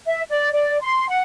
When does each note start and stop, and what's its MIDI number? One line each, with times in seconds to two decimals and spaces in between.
0.07 0.22 76
0.30 0.48 74
0.52 0.78 74
0.81 1.08 84
1.08 1.22 78